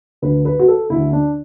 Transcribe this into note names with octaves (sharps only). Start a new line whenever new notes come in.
D2 D3 B4
B4
F#4
A4
D3 E4
D2
D4